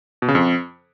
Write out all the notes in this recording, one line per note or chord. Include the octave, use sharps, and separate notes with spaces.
B2
C#3
F2